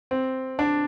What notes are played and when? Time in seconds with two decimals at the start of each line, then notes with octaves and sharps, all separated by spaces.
0.11 C4
0.59 D4